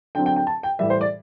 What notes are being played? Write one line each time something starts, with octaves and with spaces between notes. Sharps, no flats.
D3 F#3 C4 G5
G5
G5
A5
G5
A2 E3 G3 E5
C5
D5